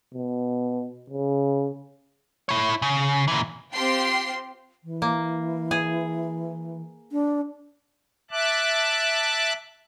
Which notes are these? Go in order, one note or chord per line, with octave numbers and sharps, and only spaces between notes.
B2
C#3
E4 C#5
C#3
A#2 E3
C4 F4 G4 G5 C6 C7
E3
A#3
G#4
D4
E5 A5 D6 F#6